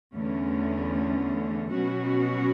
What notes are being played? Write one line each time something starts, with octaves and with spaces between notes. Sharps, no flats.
E2 D3 A3 C#4
B2 F#3 C#4 F#4